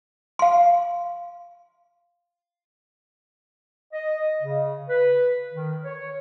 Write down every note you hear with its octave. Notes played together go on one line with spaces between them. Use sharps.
F5 C6
D#5
C#3
B4
D#3
C#5